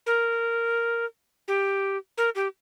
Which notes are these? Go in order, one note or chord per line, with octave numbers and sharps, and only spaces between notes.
A#4
G4
A#4
G4